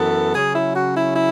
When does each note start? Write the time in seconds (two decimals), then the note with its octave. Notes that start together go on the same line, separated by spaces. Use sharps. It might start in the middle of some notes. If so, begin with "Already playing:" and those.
Already playing: F#2 E3 B3 A4
0.34 C#3 F#3 C#4 G#4
0.54 E4
0.74 F#4
0.95 E4
1.15 E4